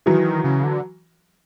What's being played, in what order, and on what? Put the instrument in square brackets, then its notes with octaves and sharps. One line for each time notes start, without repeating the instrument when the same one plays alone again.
[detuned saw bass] D#3 [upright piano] E3 F#3
[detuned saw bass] C#3
D3